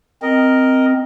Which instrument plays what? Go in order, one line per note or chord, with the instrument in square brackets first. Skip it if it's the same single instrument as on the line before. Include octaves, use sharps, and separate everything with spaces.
[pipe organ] C4 [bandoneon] A#4 D#5